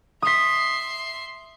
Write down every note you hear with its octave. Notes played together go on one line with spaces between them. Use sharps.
E5 C6 D#6 B6